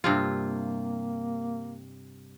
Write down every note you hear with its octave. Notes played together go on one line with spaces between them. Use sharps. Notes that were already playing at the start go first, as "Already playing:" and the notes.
G2 C3 A#3 F4